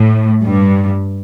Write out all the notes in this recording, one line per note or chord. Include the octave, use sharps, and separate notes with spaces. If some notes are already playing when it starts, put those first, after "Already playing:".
Already playing: A2
G2